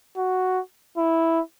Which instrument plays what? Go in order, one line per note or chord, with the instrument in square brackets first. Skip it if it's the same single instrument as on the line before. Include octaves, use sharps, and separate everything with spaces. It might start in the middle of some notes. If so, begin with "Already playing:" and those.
[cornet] F#4
E4